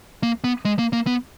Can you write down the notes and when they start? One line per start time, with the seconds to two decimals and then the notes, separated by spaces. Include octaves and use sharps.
0.23 A#3
0.44 B3
0.65 G#3
0.79 A#3
0.93 A#3
1.07 B3